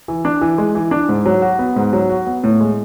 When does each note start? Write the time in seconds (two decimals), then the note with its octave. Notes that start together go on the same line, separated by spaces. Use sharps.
0.08 E3
0.25 D4
0.41 E3
0.58 G#3
0.75 E3
0.91 D4
1.09 G#2
1.26 F#3
1.42 F#4
1.59 B3
1.76 G#2
1.93 F#3
2.10 F#4
2.27 B3
2.44 A2
2.60 G#3